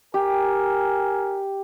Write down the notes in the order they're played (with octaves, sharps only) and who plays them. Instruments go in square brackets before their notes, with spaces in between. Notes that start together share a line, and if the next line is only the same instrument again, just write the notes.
[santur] G4 [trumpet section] A#4 G#5